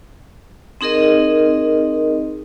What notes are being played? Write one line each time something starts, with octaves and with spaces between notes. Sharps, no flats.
C4 D#4 G#4 A#4 D#5